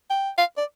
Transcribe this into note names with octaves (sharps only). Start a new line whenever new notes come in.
G5
F5
D5